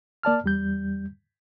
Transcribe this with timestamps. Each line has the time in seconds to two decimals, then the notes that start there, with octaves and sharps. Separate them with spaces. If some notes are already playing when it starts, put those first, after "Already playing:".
0.23 A#3 D5 A5 F6
0.44 E2 G3 G6